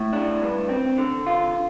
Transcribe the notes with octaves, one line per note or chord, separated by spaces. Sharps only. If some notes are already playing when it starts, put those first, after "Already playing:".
Already playing: A2
D4
G2
C4
D3
F4